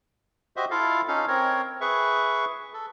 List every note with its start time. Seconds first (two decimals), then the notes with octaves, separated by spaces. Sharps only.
0.56 F#4 G4 C5 D#5 E5
0.71 E4 F4 A4 F5
1.08 C#4 D#4 A4 F5
1.28 C4 A#4 C#5
1.81 G#4 B4 E5 C#6
2.74 A4